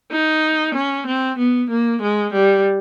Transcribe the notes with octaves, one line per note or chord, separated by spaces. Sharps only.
D#4
C#4
C4
B3
A#3
G#3
G3